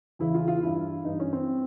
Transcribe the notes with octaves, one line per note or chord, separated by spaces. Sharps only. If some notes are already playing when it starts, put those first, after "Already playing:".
E2 C#3 E3 E4
F4
F4
G2 E3 E4
G2 E3 D#4
C#4
C4